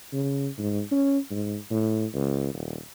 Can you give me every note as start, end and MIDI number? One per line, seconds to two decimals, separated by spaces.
0.13 0.48 49
0.58 0.81 44
0.91 1.18 61
1.31 1.56 44
1.71 2.05 45
2.14 2.53 37
2.53 2.77 27